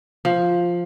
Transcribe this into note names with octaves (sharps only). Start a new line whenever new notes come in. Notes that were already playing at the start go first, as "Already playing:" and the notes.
F3